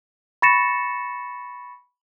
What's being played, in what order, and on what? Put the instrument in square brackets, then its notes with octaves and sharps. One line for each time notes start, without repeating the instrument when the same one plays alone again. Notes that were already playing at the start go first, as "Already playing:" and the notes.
[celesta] B5 C#6 A6 A#6 C#7 E7